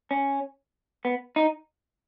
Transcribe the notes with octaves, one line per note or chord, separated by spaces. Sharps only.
C#4
B3
D#4